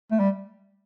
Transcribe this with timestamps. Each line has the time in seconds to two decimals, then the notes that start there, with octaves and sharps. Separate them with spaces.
0.11 A3
0.20 G3